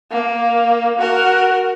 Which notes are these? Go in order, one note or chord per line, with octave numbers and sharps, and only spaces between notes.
A#3
F#4 A#4